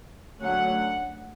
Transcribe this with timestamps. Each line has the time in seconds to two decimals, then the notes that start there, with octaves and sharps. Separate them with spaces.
0.42 D3 F#3 A3 C#4 F#5